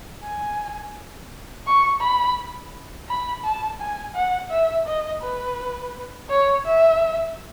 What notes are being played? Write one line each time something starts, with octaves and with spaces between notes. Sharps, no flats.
G#5
C#6
B5
B5
A5
G#5
F#5
E5
D#5
B4
C#5
E5